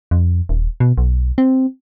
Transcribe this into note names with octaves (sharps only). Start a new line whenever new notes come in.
F2
D#1
B2
B1
C4